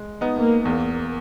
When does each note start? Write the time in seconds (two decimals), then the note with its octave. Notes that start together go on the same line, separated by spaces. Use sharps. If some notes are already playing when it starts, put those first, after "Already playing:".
Already playing: G#3
0.21 B3 D#4
0.36 A#3
0.65 E2 A#3